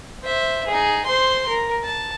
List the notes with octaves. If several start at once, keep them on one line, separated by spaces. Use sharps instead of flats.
C5 E5
D#4 G#4
C5 C6
A#4
A5